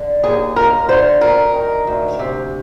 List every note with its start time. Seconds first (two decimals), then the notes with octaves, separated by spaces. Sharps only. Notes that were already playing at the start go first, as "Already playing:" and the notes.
Already playing: D3
0.23 D#2 G#4
0.56 D#2 A#4
0.89 D3 C5
1.21 D2 A#4
1.54 D#3
1.87 D2
2.19 C3